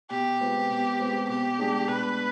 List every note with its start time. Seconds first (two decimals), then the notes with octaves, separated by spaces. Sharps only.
0.10 B2 G4
0.40 G#3 C4 F4 B4
0.70 B2
0.99 G#3 C4 F4 B4
1.29 B2 G4
1.58 G#3 D4 G#4
1.88 B2 B4